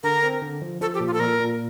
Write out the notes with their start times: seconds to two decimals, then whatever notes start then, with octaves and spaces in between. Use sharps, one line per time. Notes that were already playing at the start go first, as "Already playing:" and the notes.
0.03 D3 A#4
0.23 C4
0.42 D3
0.62 F3
0.81 F3 A4
0.94 G4
1.00 A#2
1.07 F4
1.13 A4
1.20 A#2 A#4
1.39 A#2